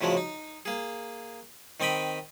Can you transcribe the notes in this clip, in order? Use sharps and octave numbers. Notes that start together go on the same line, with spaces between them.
A2 C#3 F3 F#3 G#3 A3
D#4
A#3 G#4
D#3 C4 D#5 G5 B5